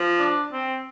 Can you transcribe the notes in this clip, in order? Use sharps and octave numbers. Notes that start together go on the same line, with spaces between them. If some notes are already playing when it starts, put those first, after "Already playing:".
Already playing: F3
D4
C4